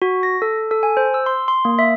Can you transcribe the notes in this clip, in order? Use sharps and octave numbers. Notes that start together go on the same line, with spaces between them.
F#4
A#6
A4
A4
G#5
C5
E6
C6
C6
A#3
E5